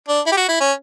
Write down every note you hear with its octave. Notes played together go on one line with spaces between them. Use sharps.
D4
E4
G4
F#4
E4
C#4